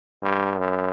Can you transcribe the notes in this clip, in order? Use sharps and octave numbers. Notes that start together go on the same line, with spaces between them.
G2
F#2